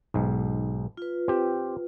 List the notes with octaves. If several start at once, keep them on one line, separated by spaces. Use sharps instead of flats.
B1 G#2
F4 B4
C4 G4